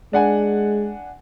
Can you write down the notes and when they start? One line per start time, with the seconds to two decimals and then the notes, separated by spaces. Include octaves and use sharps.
0.13 G#3 D4 F#5 G#5